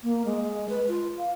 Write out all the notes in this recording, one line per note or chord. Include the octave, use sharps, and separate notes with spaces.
A#3
G#3
B4
F4
F5